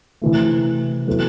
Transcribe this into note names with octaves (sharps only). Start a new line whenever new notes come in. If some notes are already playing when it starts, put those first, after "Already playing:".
C3 E3 A3
F#3 B3 E4 A4